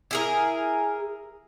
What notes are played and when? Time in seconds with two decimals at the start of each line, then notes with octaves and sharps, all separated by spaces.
0.11 E4 G#4 A#4